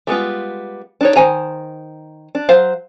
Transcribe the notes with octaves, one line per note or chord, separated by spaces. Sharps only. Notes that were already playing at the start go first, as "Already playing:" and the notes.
G3 G#3 B3 F4
D4 D#4 C#5
D#3 C5 G#5 A#5
D4
F#3 C5 F5